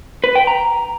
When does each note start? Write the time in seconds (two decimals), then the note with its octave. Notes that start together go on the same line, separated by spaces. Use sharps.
0.24 B4
0.35 G5
0.47 A#5